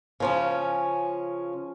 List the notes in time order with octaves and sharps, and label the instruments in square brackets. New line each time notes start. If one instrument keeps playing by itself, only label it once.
[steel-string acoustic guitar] C#3 F3 C#4